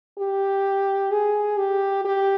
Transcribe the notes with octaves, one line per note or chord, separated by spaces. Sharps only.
G4
G#4
G4
G4